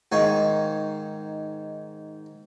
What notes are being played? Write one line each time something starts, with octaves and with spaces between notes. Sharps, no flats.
G#2 D#3 D#4 F5 G#5 C#6